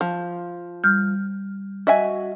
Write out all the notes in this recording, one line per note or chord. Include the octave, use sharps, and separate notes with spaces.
F3
G3 F6 G6
F#4 D#5 E5 G#5